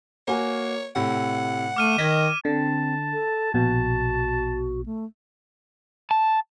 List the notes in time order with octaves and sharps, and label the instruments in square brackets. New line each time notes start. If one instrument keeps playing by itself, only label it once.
[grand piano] A#3 F#4 G#5 [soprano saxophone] C#5
[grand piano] A2 C3 [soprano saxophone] F#5
[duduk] A3 [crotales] D6 F6 D#7
[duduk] D#3 [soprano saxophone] D#5 [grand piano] G#6 A#6 B6
[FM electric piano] D3 [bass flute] C4 [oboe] A5
[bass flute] A4
[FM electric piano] A#1 B2 [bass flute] F#4 [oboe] A5
[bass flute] A3
[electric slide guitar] A5